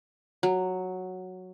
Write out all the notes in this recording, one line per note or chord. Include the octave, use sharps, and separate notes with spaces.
F#3